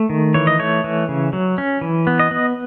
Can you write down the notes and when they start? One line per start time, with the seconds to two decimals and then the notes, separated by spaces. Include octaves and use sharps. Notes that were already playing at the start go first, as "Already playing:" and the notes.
Already playing: A3
0.10 D#3
0.34 E3 C#5
0.47 D#5
0.59 A3 C#5
0.84 E3
1.09 C#3
1.33 F#3
1.58 C#4
1.81 E3
2.07 B3
2.20 D#5
2.31 B3